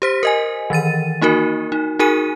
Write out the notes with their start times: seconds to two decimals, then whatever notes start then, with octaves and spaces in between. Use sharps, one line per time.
0.02 G4 C5 B6
0.23 A#4 D#5 G#5
0.70 D#3 E3 A6 D#7
1.22 A#3 D#4 F#4 A#4
1.72 D#4
1.99 D#4 F#4 G#4 A#4 G#5 D#7